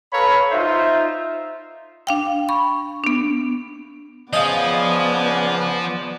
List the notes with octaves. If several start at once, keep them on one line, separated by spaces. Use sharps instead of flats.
A4 B4 C#5 F5 A#5 B5
D#4 F4 C5 E5
D4 F5 G5
B5 C#6
B3 D4
C#3 F3 B3 D5 D#5 F5 G#5